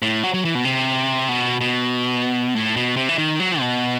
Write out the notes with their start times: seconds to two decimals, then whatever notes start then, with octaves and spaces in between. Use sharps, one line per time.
0.02 A2
0.23 F#3
0.34 F#3
0.45 E3
0.55 B2
0.65 C3
1.29 B2
1.61 B2
2.55 A2
2.76 B2
2.96 C3
3.09 E3
3.18 D#3
3.40 F#3
3.60 B2